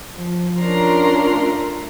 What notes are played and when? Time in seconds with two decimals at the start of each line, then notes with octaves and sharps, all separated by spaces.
0.15 F3
0.59 C#4 D4 F4 A#4 A#5 C6
1.35 A3